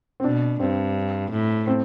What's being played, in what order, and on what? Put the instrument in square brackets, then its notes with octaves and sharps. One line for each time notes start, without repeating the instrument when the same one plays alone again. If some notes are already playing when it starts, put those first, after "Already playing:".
[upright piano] C4
[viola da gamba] B2 [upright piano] D4
[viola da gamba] G2 [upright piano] C4
[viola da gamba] A2
[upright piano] C4